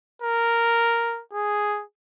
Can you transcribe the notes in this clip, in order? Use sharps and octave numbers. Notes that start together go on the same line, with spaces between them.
A#4
G#4